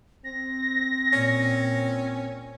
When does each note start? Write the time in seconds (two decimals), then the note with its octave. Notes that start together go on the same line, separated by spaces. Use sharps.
0.24 C4 A#6
1.13 A#2 C#4